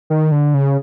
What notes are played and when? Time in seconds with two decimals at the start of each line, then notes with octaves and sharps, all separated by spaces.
0.10 D#3
0.32 D3
0.54 C#3